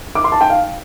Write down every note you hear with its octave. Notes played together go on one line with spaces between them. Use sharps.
D6
C6
A5
G5
F5